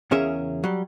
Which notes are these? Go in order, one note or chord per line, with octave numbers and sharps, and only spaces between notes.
E2 C#3 C#4 G#4 A#4 E5
F#3 G3